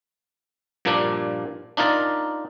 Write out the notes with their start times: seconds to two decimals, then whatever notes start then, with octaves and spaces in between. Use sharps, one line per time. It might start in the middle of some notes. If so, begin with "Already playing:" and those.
0.85 G2 A#2 F3 A#3 D4
1.77 D4 D#4 F4 A#4 D5